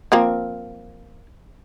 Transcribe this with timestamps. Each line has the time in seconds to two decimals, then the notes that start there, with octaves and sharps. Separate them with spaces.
0.12 F3 A#3 C4